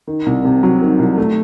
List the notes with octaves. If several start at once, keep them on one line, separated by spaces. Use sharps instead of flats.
D#3
C2
C3
F#3
D#3
C2
A3